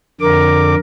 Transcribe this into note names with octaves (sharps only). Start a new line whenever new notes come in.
F2 D3 A#4 D6